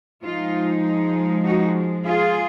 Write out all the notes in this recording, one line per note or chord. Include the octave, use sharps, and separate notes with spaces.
F3 G#3 D#4 F4
D#4 F#4
F4 G#4